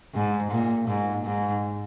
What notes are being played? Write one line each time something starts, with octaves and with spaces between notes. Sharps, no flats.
G#2
A#2
G#2
G#2